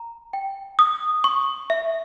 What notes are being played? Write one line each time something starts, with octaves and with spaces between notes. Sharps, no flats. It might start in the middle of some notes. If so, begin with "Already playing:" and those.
Already playing: A#5
G5
D#6
C#6
E5